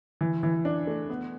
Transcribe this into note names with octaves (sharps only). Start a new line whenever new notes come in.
E3
E3
D4
A3
B3